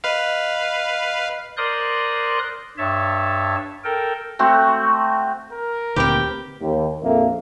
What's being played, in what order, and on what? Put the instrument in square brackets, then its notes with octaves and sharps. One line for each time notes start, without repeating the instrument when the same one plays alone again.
[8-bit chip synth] B4 F5 [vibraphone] D#5
[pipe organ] A#4 C5 D5 C6 D#6 F#6
G2 C#5 E5 A5
A4 A#4 G5
[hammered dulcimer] A3 C4 F#4
[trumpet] A#4
[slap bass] D2 A#2 D#3 [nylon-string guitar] C4 B4 [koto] G4 G5
[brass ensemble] D#2
A#1 F2 A#3 A4 E5